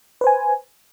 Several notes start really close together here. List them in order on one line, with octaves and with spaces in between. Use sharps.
B4 C5 G#5